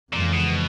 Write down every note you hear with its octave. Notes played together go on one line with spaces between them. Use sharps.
F2 A#2 C#3 E3 G#3
B2